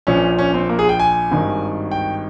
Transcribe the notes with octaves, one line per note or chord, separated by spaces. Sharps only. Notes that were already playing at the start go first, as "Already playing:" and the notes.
A#1 A#2 F3 C#4
C#4
C4
A#3
G#4
G5
G#5
G#1 G2 D#3
G5